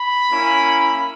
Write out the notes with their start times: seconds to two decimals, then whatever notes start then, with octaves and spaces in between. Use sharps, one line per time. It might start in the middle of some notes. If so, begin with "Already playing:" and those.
Already playing: B5
0.30 A#3 C#4 E4